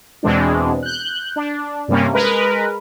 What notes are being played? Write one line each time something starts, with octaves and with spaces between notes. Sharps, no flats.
E2 B2 E3 G#3 C4 D4
F#6 G6
D4
G2 C3 G3 A#3 C#4
G#3 A#4 B4